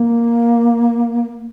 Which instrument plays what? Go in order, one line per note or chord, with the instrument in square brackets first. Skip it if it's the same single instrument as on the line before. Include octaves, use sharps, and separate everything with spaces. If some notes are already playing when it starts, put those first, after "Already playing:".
Already playing: [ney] A#3